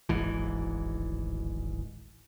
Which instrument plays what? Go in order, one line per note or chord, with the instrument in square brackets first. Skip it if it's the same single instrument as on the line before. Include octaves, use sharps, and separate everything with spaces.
[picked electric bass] D1 G#1 G#2 E3